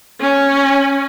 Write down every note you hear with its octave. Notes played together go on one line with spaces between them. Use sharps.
C#4